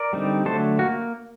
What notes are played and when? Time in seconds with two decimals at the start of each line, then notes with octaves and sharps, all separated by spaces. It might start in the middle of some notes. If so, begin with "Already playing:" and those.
Already playing: A#4 D5
0.13 D3 G3 C4 D#4
0.45 D3 F#3 A3 A4 C5
0.79 A#3 F#4